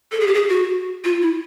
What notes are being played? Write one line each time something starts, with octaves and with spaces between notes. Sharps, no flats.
A4
G#4
G4
G#4
F#4
F4
E4